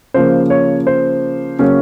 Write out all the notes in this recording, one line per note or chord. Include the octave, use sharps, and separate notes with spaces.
C#3 F3 A#3 C5
C#5
C5
C#3 F#3 A#3 C#4